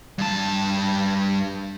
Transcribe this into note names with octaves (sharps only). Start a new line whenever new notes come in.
G2 A5